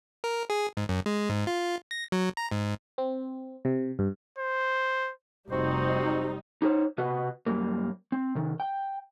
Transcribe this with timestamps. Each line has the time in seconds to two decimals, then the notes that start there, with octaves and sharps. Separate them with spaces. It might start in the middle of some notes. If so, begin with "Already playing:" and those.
0.24 A#4
0.50 G#4
0.77 G#2
0.89 F#2
1.06 G#3
1.29 G#2
1.47 F4
1.91 A#6
2.12 F#3
2.37 A#5
2.51 G#2
2.98 C4
3.65 C3
3.99 G2
4.38 C5
5.50 F1 G3 C4 D#4 F#4 C5
6.62 D#4 G4 G#4 C5 C#5
6.98 C3 F#4 B4 D#5 F#5
7.46 F#2 G3 A#3
8.12 C4
8.35 C3 D#3
8.60 G5